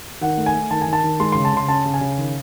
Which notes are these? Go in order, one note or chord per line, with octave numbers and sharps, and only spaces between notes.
D#3 F#5
A3
G#5
A3
D#3 A5
G#5
D#3
A5
D#3
G#3 C6
C#3 C6
A5
C#3 C6
C#4 A5
C#3
G#5
C#3
D#3